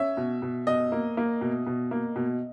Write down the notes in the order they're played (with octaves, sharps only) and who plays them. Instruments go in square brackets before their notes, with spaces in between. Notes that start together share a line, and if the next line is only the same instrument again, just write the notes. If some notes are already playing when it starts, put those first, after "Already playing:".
Already playing: [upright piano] C#4 [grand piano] E5
[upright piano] B2
B2
[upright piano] B2 [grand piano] D#5
[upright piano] A#3
A#3
B2
B2
A#3
B2